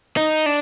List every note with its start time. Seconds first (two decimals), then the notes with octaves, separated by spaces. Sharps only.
0.17 D#4
0.46 D4